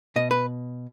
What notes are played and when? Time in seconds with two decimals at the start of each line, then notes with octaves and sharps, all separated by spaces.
0.16 B2 D#5
0.31 B4